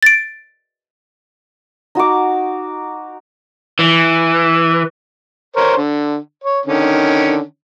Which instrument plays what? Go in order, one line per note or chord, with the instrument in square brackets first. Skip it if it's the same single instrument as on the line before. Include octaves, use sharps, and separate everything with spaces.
[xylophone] A6 D7
[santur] D#4 F#4 A#5 D6
[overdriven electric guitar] E3
[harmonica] A#4 C5 C#5
D3
C#5
D3 D#3 C#4